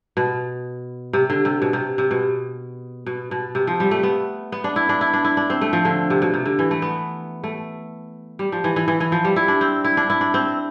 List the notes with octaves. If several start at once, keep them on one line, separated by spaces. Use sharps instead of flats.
B2
C3
D3
C3
B2
C3
C3
B2
B2
B2
C3
F3
G3
A3
B3
B3
D4
E4
D4
E4
D4
E4
D4
C4
A3
F3
D3
C3
B2
C3
D3
E3
A3
B3
A3
G3
F3
E3
E3
E3
E3
F3
G3
E4
D4
C4
E4
D4
E4
D4
C4